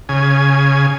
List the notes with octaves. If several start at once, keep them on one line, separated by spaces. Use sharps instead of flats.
C#3 G#5